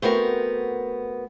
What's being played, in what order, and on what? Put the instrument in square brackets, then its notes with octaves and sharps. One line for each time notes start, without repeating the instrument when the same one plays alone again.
[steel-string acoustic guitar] A3 B3 C4 F#4 A#4